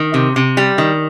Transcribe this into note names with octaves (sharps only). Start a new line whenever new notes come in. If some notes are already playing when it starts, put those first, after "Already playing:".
Already playing: D#3
C3
C3
G3
D#3